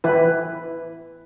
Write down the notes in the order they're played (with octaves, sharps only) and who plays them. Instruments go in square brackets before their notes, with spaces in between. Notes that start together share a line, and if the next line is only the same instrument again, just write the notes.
[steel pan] E3 E4 B4